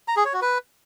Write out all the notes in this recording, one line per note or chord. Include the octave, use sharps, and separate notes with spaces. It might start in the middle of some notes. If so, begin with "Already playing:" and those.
A#5
G#4
C#5
F#4
B4